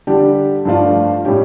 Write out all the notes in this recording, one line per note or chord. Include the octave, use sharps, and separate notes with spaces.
D3 G3 D4 G4
G2 F3 A3 D4 F4
A2 G3 C#4 G4